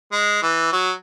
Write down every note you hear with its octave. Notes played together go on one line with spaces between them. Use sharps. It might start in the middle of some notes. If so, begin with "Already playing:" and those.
G#3
E3
F#3